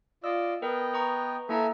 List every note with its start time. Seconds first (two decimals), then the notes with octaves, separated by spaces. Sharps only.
0.24 F4 D5 D#5 E6
0.62 B3 A#4 B4 D#5 G5
0.94 B4 A#5 C#6
1.49 A#3 E4 A4 E5 G#5 A#5